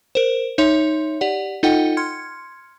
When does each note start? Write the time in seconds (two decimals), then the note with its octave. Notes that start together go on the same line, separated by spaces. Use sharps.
0.15 A#4 C5
0.58 D#4 C#5 E5 C6
1.21 G4 D5 F#5
1.63 D#4 F4 A4 D#5 F#5 G5
1.97 C6 F6 G#6 C#7